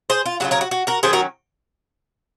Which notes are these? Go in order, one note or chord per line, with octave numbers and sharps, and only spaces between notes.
G#4 C5
F4
C#3 F#3 C#4 F4 F#4
A#4 C#5
F#4
F#4
F#4 A#4
D#3 F#3 C#4 G#4 C5
F#4 A#4